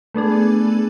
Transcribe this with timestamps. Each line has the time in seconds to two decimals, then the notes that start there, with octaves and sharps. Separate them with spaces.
0.14 A3 B3 D4 G#4